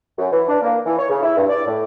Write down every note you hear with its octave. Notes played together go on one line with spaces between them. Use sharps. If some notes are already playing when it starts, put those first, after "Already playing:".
F#2
E3
D4
A#3
E3
C#5
C#3
E4
G2
D5
A2